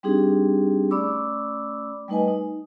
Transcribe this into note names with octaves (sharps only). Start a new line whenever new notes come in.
G3 C4 D4 D#4 G4 G#4
A3 C#4 D5 B5 D6 E6
G3 A3 D#4 B4 D#5 G#5
D#4